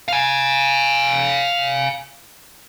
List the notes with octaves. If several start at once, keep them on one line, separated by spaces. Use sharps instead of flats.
F5 G#5